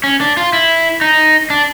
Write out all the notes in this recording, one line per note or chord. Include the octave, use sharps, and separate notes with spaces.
C#4
D4
F4
E4
D#4
D4